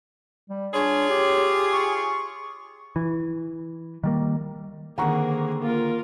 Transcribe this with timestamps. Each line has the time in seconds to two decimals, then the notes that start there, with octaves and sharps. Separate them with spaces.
0.49 G3
0.74 D4 F4 G#4 C#5
1.10 G4
1.73 C#6
2.96 E3
4.04 D#3 G3 A#3
4.98 D3 D#3 A#3 C4 G#4 F#5 A#5 C#6
5.62 A#3 F4 A#4